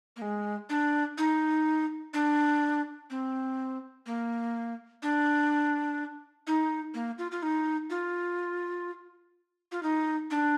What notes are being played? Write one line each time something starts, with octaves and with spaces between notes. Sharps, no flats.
A#3
G#3
D4
D#4
D4
C4
A#3
D4
D#4
A#3
F4
F4
D#4
F4
F4
D#4
D4